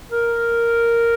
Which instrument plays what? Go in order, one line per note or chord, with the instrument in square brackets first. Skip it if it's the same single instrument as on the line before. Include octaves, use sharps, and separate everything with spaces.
[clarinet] A#4